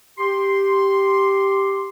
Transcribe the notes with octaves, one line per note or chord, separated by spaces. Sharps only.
G4 C6